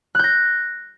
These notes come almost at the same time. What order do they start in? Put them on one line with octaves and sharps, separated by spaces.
F#6 G6 A#6